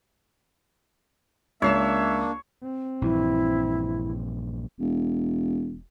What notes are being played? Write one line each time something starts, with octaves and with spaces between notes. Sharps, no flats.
C#2 A#3 D4 C#5 E5 C7 E7
C4
A#1 G2 E3 E4
E1